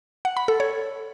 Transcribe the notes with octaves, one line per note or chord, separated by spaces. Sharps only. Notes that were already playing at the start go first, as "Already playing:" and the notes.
F#5
B5
A4
C#5